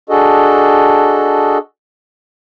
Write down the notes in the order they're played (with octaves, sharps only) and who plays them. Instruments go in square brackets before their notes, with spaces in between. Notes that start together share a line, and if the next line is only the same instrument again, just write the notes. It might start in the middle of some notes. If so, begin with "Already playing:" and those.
[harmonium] D4 F#4 G#4 A4 D#5